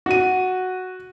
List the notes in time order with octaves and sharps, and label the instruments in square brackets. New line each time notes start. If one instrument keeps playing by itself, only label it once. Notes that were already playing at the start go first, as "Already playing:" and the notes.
[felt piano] F#4 D#7